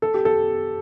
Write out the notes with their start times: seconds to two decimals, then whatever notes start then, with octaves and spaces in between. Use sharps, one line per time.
0.02 A4
0.14 G4
0.25 A4